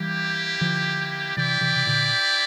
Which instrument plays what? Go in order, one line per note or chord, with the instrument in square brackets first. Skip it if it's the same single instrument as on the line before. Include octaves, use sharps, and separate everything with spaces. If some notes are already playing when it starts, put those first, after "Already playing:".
Already playing: [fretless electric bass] E3 G3 [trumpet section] A#3 E4 G4
[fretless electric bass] D3 F3
[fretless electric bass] C3 E3 [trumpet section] E4 G4 D5 G5
[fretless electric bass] C3 E3
C3
A#2 D3